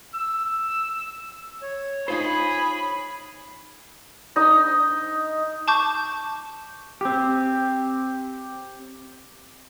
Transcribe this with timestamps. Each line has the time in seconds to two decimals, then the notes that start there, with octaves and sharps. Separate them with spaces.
0.14 E6
1.62 C#5
2.08 D#4 F4 G#4 C5 B5
4.36 D#4 D#5
5.68 A5 C#6 D6 G6
7.01 C4 G4